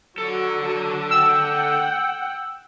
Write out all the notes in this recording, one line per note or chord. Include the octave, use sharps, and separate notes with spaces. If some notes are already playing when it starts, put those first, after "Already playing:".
D3 F#3 F#4 A4
F#5 G5 E6